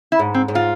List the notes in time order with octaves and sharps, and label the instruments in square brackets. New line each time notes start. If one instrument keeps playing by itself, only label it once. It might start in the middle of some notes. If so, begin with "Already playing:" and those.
[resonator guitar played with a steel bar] E4
[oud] G#2
[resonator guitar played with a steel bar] C4
[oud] G#2
[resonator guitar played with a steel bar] F4